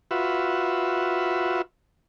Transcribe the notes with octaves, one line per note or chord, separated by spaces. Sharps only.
F4 F#4 B4 E5